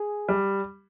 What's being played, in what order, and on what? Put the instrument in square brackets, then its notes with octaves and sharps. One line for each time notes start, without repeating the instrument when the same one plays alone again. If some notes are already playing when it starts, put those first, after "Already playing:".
Already playing: [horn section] G#4
[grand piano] G3